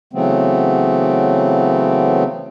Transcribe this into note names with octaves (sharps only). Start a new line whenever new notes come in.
C#3 E3 F#3 A3 B3 C4